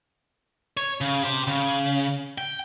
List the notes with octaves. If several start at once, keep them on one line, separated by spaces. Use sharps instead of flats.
C#5
C#3
G4 C5
C#3
G5